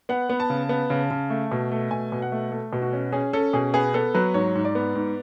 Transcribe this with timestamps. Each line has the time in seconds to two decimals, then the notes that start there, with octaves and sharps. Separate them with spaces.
0.09 B3 F#5
0.30 B3
0.40 A5
0.50 C#3
0.69 B3
0.90 C#3
1.11 C#3
1.30 A3
1.51 B2
1.71 A3
1.91 B2 G#5
2.12 B2
2.22 F#5
2.32 A3
2.52 A3 A4
2.73 B2
2.82 F#4
2.93 C#4
3.12 C#4 G#4
3.33 C#4 A4
3.53 B2 G#4
3.74 B3 G#4
3.94 B3 A4
4.15 F#3 B4
4.34 G#2 C#5
4.55 G#2
4.65 D5
4.75 B3
4.95 G#2